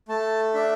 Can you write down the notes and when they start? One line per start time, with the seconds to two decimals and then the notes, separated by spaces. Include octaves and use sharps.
0.09 A3 A5
0.54 D4 E5